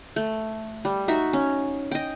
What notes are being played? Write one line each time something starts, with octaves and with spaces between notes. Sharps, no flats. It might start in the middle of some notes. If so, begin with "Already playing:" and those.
A3
G3
D#4 F#4 E5
C#4
D#5 G5